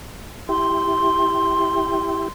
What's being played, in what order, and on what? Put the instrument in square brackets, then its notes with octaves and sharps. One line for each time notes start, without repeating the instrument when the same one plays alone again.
[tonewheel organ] E4 G4 [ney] C6